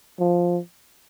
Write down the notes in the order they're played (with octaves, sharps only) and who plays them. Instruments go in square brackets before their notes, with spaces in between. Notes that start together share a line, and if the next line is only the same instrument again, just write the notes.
[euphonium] F3